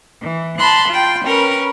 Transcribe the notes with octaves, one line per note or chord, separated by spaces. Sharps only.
E3
A5 B5 C6 F#6
F4 G5
C#4 A#4 B4